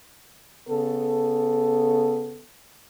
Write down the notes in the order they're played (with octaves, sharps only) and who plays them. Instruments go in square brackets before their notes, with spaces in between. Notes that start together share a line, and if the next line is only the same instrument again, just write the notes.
[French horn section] C#3 B3 A4